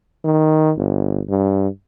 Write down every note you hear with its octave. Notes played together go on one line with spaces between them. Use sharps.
D#3
G1
G2